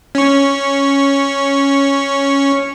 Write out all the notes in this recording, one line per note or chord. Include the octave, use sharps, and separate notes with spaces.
C#4 C#6